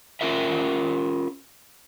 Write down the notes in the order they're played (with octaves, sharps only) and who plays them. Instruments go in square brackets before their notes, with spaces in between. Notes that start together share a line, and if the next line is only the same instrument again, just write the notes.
[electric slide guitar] C#4 F4 A#4 E5